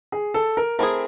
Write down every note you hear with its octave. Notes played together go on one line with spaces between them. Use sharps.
G#4
A4
A#4
A3 C4 E4 G#4 A#4